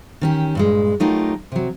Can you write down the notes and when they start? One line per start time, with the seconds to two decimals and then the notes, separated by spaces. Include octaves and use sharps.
0.21 D#3 C#4 G4
0.55 G2 A#2 G#3
1.00 F#3 A3 D#4 F4 G4 A#4
1.52 C3 F#3